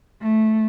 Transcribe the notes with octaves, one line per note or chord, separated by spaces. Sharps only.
A3